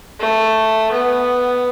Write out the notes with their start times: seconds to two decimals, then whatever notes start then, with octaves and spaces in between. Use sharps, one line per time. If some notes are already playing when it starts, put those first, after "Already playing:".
0.20 A3
0.92 B3